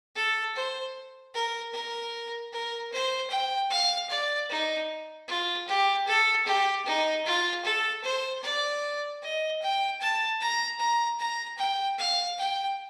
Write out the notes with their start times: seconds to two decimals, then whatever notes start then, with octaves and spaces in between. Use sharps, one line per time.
0.16 A4
0.55 C5
1.34 A#4
1.74 A#4
2.53 A#4
2.92 C5
3.31 G5
3.71 F5
4.10 D5
4.50 D#4
5.28 F4
5.68 G4
6.07 A4
6.46 G4
6.86 D#4
7.25 F4
7.65 A4
8.04 C5
8.43 D5
9.22 D#5
9.62 G5
10.01 A5
10.41 A#5
10.80 A#5
11.20 A#5
11.58 G5
11.98 F5
12.38 G5